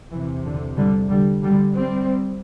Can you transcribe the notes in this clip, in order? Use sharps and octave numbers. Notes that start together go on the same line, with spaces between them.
E2 C3 E3
D3
D3 G3
D3 G3
D3 G3
G3 C4